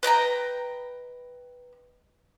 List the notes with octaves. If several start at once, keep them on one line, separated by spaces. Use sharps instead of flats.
B4 D#5 G5 A#5